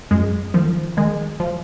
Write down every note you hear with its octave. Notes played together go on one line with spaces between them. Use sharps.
F#2 G#3
D#3 F3
D#3 G#3
F3